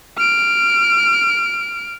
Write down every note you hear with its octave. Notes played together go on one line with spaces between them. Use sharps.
F6 D7